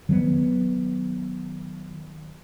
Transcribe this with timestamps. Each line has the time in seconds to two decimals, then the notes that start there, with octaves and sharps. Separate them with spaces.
0.09 D#3 F#3 A3 B3